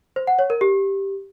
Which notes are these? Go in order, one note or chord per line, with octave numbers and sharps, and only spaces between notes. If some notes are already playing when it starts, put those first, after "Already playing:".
C5
F#5
C#5
A#4
G4